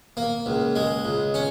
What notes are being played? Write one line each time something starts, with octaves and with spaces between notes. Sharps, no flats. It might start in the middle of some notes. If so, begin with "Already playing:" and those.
A#3
C#2
G#3
C#2
C#4